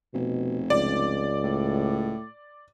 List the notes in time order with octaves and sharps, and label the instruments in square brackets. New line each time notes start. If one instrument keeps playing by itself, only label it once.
[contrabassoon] F1 [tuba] B2
[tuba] C#2 [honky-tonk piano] D5
[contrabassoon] A2